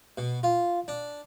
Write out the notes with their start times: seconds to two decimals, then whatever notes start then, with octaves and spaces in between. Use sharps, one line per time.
0.18 B2
0.43 F4
0.88 D4